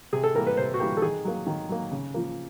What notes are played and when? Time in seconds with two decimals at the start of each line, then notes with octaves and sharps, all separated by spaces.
0.13 C3 G#4
0.24 A4
0.35 E3 G3 A#3 A#4
0.47 B4
0.57 C3 C5
0.74 F#4
0.80 E3 G3 A#3 G4
0.97 A4
1.02 D#3 G#4
1.25 F#3 A#3
1.47 D#3
1.69 F#3 A#3
1.91 C#3
2.14 F3 A#3